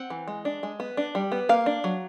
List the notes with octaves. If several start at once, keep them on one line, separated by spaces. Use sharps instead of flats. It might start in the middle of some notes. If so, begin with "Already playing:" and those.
Already playing: C4 F#5
E3
G#3
D4
G#3
B3
D4
G3
B3
A#3 F5
D4
F#3